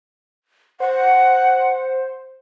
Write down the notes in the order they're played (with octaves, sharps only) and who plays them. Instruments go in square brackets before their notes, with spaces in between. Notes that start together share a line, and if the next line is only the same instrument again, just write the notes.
[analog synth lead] C5 [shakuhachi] F#5